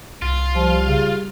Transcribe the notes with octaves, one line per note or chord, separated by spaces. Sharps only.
C2 F4
F3 G3
C#3